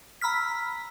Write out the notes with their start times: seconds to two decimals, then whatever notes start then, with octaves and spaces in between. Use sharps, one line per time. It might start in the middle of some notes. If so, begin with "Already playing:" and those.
0.21 A#5 B5 E6 F6 B6